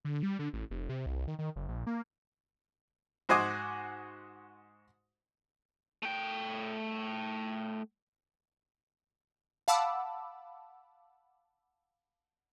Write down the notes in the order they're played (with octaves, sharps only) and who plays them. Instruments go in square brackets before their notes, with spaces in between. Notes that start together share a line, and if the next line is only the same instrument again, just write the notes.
[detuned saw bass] D3
G3
D3
A1
F1
C3
C2
D#3
D#3
F#1
A#1
A#3
[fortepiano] G#2 F#4 C5 D#5 G#5 D6
[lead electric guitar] A3 G5
[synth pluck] F5 F#5 A5 B5 D6 E6